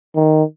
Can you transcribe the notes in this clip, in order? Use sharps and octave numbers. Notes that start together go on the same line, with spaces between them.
D#3